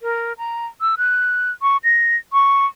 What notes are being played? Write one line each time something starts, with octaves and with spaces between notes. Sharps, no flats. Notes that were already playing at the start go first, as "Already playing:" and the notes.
A#4
A#5
E6
F#6
C#6
A#6
C#6